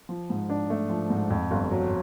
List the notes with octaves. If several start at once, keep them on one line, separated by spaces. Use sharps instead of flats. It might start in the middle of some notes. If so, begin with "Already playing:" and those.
F3
G#2
D4
A3
F3
G#2
F2
G1
F#3